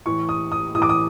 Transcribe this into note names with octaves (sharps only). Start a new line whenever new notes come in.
A2 E3 C#6
D#6
D#6
A2 E3 D6 D#6
D#6